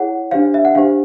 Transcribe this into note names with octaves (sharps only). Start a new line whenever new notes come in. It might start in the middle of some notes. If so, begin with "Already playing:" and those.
Already playing: E4 G#4 C#5 F#5
D4 G4 C5 F5
E5
F#5
D4 G4 C5 F5